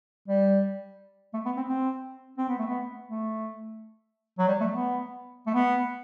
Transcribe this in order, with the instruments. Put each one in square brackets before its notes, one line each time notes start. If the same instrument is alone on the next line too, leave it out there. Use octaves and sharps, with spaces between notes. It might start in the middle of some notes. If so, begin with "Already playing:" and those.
[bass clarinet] G3
A3
B3
C4
C4
C4
B3
A3
B3
A3
F#3
G3
A3
B3
A3
B3